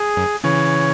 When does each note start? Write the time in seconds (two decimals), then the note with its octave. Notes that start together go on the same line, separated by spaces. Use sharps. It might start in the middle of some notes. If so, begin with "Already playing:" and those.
Already playing: G#4
0.17 F#2
0.44 C#3 E3 C#5